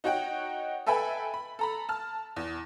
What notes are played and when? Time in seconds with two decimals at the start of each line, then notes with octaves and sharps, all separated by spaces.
0.04 D#4 F#4 C#5 F#5 G5
0.87 A4 B4 E5 G5 G#5 B5
1.34 B5
1.59 A4 A#5 B5
1.89 A5 F6
2.36 E2